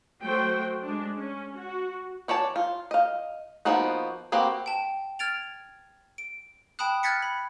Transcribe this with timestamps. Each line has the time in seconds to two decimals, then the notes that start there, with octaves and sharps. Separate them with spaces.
0.24 F#3 A3 F#4 C5 G5
0.84 G#3 D4
1.17 C#4
1.58 F#4
2.28 E3 C#5 D5 A5
2.56 F4
2.91 D#5 F5
3.65 F3 A#3 B3 D#4 F#4
4.32 A#3 C4 F#4 G4 B4
4.66 G5 A5
5.19 F6 G#6 A6 D7 F7
6.18 D7
6.79 G5 A5 B5 D#6 F#6
7.03 F6 F#6 G#6 A6 B6 C#7
7.22 B5